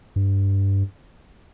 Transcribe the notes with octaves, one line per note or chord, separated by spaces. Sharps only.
G2